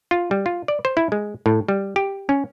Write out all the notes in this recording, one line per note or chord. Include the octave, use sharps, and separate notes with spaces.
F4
G3
F4
D5
C5
E4
G#3
A2
G3
G4
C#4